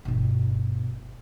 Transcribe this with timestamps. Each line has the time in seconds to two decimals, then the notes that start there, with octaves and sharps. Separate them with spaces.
0.05 G1 B2